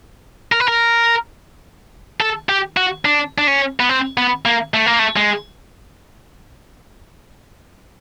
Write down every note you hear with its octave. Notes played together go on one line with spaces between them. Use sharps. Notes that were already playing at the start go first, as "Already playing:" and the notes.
A#4
B4
A#4
A4
G4
F#4
D4
D4
C#4
B3
C4
B3
A#3
A3
A#3
A3
G#3